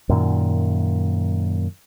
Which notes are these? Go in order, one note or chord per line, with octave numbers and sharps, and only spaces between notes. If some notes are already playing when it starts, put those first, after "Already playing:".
F#2 A#2 D#3